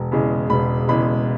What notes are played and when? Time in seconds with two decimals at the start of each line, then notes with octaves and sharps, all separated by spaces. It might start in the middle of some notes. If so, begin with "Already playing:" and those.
Already playing: E1 A#5
0.12 E2 C#3 G#3
0.50 E1 B5
0.88 E2 C#3 G#3 B5